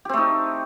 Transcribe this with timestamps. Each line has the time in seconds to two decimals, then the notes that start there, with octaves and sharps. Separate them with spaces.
0.05 G4
0.09 C4
0.13 A3
0.18 D#4